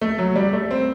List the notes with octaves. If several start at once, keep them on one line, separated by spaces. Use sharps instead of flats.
A3
F#3
G3
A3
C4